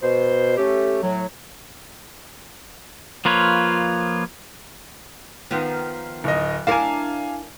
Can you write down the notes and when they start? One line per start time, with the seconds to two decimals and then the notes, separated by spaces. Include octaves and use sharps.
0.02 B2 C5
0.58 A3 C#4 G4
1.02 A2 F#3
3.25 F3 A#3 F4 B4 C#5
5.51 D#3 F3 B3
6.24 D1 D#5
6.67 D4 E4 A#4 F5 G#5